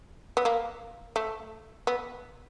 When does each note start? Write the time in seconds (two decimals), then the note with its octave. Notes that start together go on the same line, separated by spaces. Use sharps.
0.37 B3
0.45 A#3
1.16 A3
1.87 B3